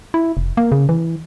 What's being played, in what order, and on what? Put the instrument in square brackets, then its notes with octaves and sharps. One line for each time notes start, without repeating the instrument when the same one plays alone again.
[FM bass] E4
F1
A#3
C#3
E3